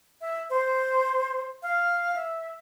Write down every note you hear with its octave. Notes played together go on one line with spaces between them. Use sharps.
E5
C5
F5
E5